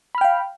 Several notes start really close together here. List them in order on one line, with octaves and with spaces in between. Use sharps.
B5 F6 G5 F5